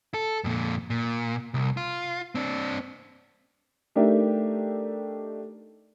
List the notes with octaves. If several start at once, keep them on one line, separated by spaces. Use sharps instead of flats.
A4
F2 A#2
A#2
C2
F4
C4 D4
A3 D4 D#4 G4 A#4 E5